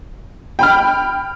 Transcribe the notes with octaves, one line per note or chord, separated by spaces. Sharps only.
G5 B5 F6